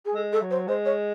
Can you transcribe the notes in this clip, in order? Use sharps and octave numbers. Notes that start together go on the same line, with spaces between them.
G#4
G#3 A4
A4
F#3
C5
G#3 C5
C#5